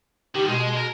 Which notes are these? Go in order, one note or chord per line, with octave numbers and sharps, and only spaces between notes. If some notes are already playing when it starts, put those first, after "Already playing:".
D#3 G3 G4
B2 G#3
A#4